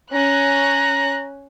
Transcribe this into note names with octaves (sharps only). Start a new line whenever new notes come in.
C#4 A#5 F#6